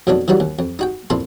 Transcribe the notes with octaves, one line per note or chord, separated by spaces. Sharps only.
F2 B2 F#3 A3 D4 D#4
E3 F#3 G3 D#4 F#4
D#2
F2
D#4 F#4 G5
F2 A#2 E4 F4 A4 C6